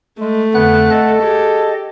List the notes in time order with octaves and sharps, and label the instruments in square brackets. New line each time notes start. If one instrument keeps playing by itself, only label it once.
[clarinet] G#3 [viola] A3
[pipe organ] F2 D3 F#6 [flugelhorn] B3 [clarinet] F#5
[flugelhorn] A4 [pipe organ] D#5
[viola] G4 [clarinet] G#4